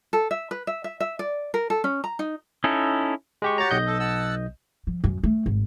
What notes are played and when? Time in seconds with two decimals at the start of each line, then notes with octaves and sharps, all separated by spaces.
0.13 A4
0.31 E5
0.51 B4
0.67 E5
0.84 E5
1.00 E5
1.19 D5
1.54 A#4
1.70 A4
1.84 C#4
2.04 A#5
2.19 D#4
2.64 C#4 D#4 E4 A4
3.42 G#3 G4 C#6
3.58 F#4 G4 C#5 A#5 A6
3.71 B1 D#5 G6
3.86 A4
4.00 F#5 A5 E6
4.87 F3
5.04 F#2
5.24 A3
5.46 G#1